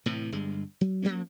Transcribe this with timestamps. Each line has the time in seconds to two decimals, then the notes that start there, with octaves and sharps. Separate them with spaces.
0.06 A2 C3 E3
0.32 G1 G2 G#3
0.81 F#3
1.02 F3 F#3 A#3 C#4